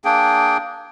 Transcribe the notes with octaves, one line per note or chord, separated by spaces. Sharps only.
A#3 D4 G#4 G5